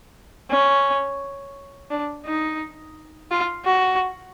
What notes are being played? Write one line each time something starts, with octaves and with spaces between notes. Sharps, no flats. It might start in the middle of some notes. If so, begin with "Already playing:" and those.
C#4
D4
D#4
F4
F#4